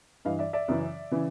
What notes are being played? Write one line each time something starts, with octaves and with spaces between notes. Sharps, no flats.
G2 E3 D#5 F5
D5 E5
D5 E5
F#2 C#3 E3
C#3 E3